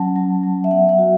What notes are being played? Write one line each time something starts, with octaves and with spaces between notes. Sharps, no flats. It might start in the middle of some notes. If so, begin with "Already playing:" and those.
Already playing: F#3 C#4 F#5 A5
F#3
F#3
E5
B3 F#5
F#5
F#4